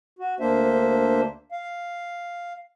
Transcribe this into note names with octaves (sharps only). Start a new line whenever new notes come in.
F#4
D2 A#3 D4 C5 E5
F5